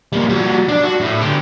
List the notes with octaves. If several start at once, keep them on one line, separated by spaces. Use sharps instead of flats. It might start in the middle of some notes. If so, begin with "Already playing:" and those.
G3 A#3
G3 F#4
D4 D5
F#4
A2
D3 G4